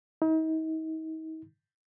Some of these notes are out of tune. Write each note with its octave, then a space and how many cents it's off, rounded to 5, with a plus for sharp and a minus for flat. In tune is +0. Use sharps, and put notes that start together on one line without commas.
D#4 +40